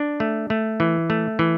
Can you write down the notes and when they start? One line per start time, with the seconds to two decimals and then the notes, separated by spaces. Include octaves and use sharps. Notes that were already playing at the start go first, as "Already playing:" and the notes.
Already playing: D4
0.20 A3
0.50 A3
0.80 E3
1.10 A3
1.39 E3